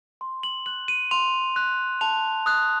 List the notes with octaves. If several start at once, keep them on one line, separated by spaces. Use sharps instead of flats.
C6
F#7
F#6 F#7
D#7
C6 F7
F#6
A5 F7
D#6 F#6